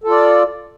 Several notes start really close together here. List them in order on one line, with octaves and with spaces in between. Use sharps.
A4 F4 D5